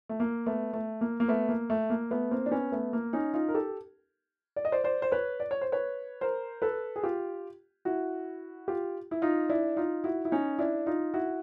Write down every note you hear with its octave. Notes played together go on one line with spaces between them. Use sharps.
A3
A#3
A3 B3
A3
A#3
A#3
A3 B3
A#3
A3
A#3
A3 B3
A#3 C4
D4
B3 C#4
A3 B3
A#3
C#4 D#4
D#4 F4
A#4
G4 A4
D5
D#5
C5 D5
C5 D5
C5
B4 C#5
D5
C#5
C5
B4 C#5
A#4 C5
A4 B4
G#4
F4 G4
E4 F#4
F4 G4
E4
D#4 F4
D4 E4
D#4 F4
E4 F#4
E4
C#4 D#4
D4 E4
D#4 F4
E4 F#4